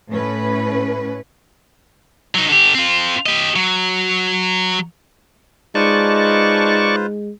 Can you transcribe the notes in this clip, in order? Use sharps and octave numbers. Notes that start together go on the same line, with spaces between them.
A2 C#4 B4
F#3 D#4
D3 G4
C4 F4
G4 D#5
F#3
G#3 D#4 F4 B4 C5 D5 A5 C#6